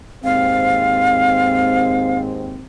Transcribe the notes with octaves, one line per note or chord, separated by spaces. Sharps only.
D#2 G#2 C4 F5